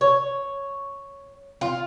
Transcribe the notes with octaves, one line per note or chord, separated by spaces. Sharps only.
C#5
F4